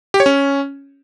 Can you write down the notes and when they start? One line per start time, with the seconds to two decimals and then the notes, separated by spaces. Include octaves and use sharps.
0.14 G4
0.20 C#5
0.26 C#4